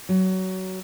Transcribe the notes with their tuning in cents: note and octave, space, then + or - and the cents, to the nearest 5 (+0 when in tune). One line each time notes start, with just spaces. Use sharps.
F#3 +20